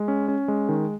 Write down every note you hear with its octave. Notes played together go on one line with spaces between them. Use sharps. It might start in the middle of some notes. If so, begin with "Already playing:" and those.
Already playing: G#3
C#4
C#4
G#3
D#3